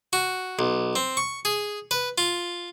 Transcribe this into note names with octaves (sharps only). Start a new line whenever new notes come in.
F#4
B1
C4
C#6
G#4
B4
F4